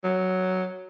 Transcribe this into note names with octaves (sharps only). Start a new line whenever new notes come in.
F#3